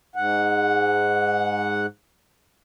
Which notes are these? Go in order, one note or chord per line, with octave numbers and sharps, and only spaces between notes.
G#2 F#5